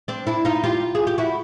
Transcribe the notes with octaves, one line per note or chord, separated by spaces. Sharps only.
C4 D4
D4 E4
D#4 F4
F4 G4
G#4
G4
E4 F#4